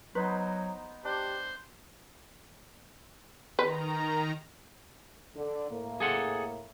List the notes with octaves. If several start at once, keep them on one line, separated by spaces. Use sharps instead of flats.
F#3 B3 D#4 B4 C5
D4 G4 C5
D#3 B4 A#5
D3
A2 A#3
G#4 A4 F#5